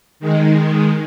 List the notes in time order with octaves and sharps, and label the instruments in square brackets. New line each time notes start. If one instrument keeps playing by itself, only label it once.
[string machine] D#3 G#3